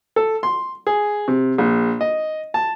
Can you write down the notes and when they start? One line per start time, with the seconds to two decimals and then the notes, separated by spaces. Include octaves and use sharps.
0.16 A4
0.43 C6
0.87 G#4
1.28 C3
1.58 A#1
2.01 D#5
2.54 A5